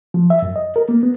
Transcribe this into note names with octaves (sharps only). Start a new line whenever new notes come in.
F3
E5
F#2
D#5
A#4
A#3
B3